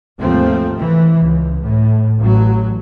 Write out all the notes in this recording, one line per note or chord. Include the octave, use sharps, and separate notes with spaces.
D#2 G#2 F3 A3 C4
E3
C#2
A2
A1 F#3